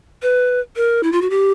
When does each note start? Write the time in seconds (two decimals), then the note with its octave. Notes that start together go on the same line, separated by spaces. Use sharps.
0.22 B4
0.76 A#4
1.03 E4
1.12 F4
1.22 F#4
1.30 G4